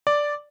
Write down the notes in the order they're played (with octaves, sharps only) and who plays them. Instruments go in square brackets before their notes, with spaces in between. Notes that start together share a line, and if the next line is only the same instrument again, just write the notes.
[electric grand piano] D5